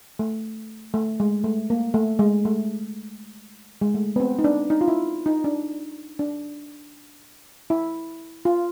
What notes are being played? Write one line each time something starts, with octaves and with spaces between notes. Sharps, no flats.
A3
A3
G#3
A3
A#3
A3
G#3
A3
G#3
A3
B3
C4
D#4
D4
D#4
F4
E4
D#4
D4
D4
E4
F4